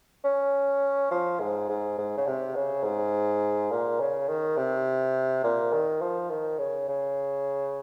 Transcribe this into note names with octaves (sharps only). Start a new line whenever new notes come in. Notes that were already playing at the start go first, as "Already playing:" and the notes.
C#4
F3
G#2
G#2
G#2
C#3
C3
C#3
G#2
A#2
C#3
D#3
C3
A#2
D#3
F3
D#3
C#3
C#3